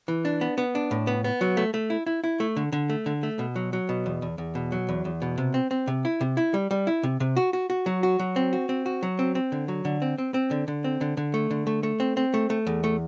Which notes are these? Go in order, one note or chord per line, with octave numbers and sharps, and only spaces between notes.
E3
D4
B3
B3
D4
A2
B3
B3
F#3
A3
A3
E4
E4
E4
A3
D3
D3
A3
D3
A3
B2
F#3
F#3
B2
E2
E2
E2
B2
F#3
E2
E2
B2
C3
C4
C4
C3
E4
C3
E4
G3
G3
E4
C3
C3
F#4
F#4
F#4
F#3
F#4
F#3
C4
F#4
C4
F#4
F#3
C4
C4
D3
F#3
D3
C4
C4
C4
D3
D3
C4
D3
D3
A3
D3
A3
A3
C4
C4
A3
A3
E2
A3